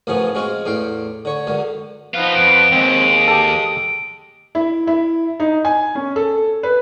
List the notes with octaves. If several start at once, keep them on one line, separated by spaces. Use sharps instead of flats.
A1 F#2 C#3 F3 B3 G#4
G#3 C4 C#4 F4 F#4
E2 A2 F5 G5 C6
D3 C#5
C#2 F#2 D3
F3 B3 D#4 F4 B4
F2 D7
D#2 G#3 C4 D#6
G4 A4
E4
E4
D#4
G#5
C#4
A4
B4